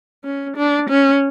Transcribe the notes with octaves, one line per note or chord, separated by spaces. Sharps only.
C#4
D4
C#4